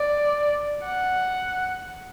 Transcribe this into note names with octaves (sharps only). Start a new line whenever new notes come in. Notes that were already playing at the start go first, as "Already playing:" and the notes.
Already playing: D5
F#5